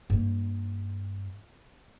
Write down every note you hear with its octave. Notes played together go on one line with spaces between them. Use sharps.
G2 A#3